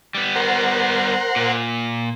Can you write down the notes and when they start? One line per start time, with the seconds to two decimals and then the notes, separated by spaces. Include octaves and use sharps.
0.15 G3 B3
0.36 A#4 C5 F#5
1.36 A#2